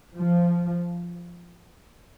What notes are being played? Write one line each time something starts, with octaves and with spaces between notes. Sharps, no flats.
F3